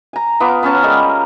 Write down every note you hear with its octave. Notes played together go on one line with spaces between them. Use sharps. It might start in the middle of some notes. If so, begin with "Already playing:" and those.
G#5 A#5
B3 F4 D6
B3 C#4 A5 A#5
G3 G#3 G4 A#4